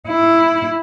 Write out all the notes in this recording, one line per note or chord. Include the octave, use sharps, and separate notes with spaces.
E4